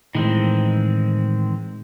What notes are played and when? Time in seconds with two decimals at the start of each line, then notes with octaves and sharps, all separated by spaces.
0.15 A2 D#3 E3 G#3 C4